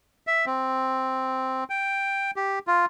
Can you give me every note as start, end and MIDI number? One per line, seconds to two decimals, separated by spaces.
0.27 0.45 76
0.46 1.64 60
1.70 2.31 79
2.36 2.59 67
2.67 2.86 65